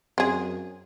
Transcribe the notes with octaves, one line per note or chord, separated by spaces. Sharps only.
F#2 C4 G#4